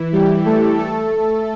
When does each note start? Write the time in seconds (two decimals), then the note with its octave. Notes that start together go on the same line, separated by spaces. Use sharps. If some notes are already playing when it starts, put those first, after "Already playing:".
Already playing: E3 E4
0.12 G3 G4
0.46 A3 A4
0.78 A3 A4